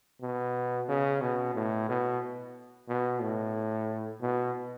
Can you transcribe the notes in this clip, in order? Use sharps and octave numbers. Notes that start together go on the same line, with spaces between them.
B2
C#3
B2
A2
B2
B2
A2
B2